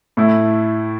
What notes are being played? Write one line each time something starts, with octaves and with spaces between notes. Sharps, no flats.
A2 A3 E4